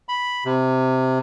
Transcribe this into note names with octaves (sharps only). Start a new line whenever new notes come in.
B5
C3